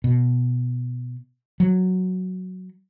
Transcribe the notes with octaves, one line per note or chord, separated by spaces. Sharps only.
B2
F#3